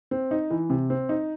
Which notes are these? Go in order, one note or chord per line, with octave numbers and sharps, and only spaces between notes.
C4
D#4
E3
C3
C4
D#4